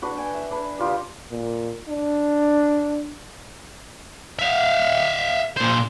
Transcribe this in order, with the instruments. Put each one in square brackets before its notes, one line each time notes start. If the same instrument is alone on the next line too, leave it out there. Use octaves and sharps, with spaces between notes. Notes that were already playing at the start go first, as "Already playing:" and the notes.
[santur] D4 F#4 B4
G5 G#5
E5
D4 B4
G3 F4 G4 D#6
[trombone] A#2
D4
[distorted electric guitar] E5 F5
A#2 C5